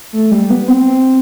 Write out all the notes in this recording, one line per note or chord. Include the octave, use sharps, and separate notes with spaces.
A3
G3
B3
C4